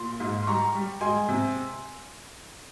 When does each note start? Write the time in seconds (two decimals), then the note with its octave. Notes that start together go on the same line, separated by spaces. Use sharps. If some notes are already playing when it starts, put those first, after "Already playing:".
Already playing: A#2 C6
0.20 G#2
0.43 C6
0.47 G3 A#5 C#6
0.75 G3
1.01 G#3 G#5 C6
1.28 C3